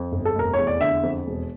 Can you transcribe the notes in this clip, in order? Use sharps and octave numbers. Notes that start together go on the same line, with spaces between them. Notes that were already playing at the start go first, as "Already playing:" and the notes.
Already playing: F2
G1
A4
F1 A#4
E2 C#5
D5
D3 E5
F2
E1